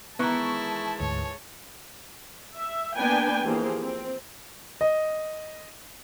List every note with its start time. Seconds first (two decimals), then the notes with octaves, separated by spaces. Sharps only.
0.19 D#3 E3 G#3 B3 E4 A5 C#6
1.00 D2 G#2 C#5
2.55 E5
2.96 A#3 B3 D4 B4 G5 G#5
3.43 E3 F3 A#3 G4 G#4 C5
3.81 C4
4.81 D#5